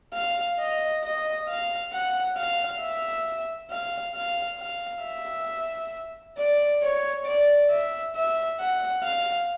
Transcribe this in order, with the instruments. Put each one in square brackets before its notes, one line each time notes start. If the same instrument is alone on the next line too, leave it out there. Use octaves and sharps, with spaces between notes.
[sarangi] F5
D#5
D#5
F5
F#5
F5
E5
F5
F5
F5
E5
D5
C#5
D5
E5
E5
F#5
F5